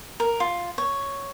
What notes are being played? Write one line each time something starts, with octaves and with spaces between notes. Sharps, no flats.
A#4
F4
C#5